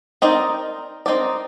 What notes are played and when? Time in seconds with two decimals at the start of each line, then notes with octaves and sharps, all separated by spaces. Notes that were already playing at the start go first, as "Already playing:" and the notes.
0.22 C4 D#4 A#4 D5
1.06 C4 D#4 A#4 D5